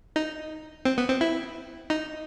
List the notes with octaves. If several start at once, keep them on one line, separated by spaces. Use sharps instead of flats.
D#4
C4
B3
C4
E4
D#4